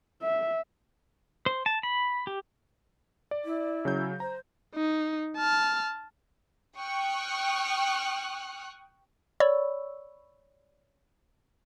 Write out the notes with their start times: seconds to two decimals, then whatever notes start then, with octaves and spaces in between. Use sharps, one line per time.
0.22 E5
1.46 C5
1.66 A5
1.83 B5
2.27 G4
3.31 D5
3.45 E4
3.85 C#3 F#3 G6
4.20 C5 A#5
4.75 D#4
5.37 A5 F6
6.79 G5 C#6 D#6 F6 F#6
9.40 C#5 D5 B5 C#6 E6